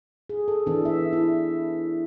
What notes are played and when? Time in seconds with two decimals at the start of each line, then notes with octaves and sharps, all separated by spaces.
0.29 G#4
0.48 A4
0.66 E3 B3 D4 A4
0.85 E5
1.13 E4